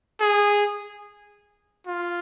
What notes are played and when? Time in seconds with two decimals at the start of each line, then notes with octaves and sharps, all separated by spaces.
0.21 G#4
1.87 F4